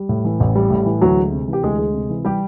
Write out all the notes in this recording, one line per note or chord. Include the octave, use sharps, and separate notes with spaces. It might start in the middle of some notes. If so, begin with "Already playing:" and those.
Already playing: G3
A2
E3
A1
G3
A2
E3
D2 F#3 F#4
G#3
C3
E3
G4
D2 G#3 G#4
G#3
C3
E3
G3 G4